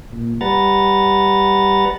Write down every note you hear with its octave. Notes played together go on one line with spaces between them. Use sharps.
A#2
G3 B4 F#5 A#5 A6